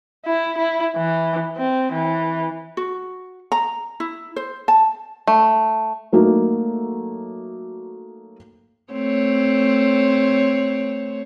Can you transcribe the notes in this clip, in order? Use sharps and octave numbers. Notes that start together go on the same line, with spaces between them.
E4
E4
E3
C4
E3
F#4
A#5
E4
C5
A5
A3
F#3 A3 A#3 D#4 F#4
A3 C4 C#5